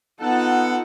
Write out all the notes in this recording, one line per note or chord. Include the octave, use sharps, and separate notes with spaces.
B3 D#4 F4 A4 F#5